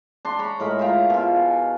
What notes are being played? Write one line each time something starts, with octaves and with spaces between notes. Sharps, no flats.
D4 C6
C#5 A#5 B5
A2 G#3 A#4 B5
F4 E5 G5 A#5
B2 F4
G#5